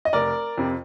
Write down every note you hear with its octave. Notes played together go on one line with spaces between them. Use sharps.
D#5
F1 A#4 D5
F2 C3